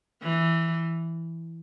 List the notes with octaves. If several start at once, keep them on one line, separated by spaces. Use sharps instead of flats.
E3